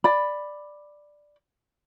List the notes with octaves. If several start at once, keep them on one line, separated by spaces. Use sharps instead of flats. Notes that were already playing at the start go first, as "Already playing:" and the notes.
D5 B5